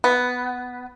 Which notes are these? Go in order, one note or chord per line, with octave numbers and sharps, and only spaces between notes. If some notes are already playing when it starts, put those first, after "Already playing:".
B3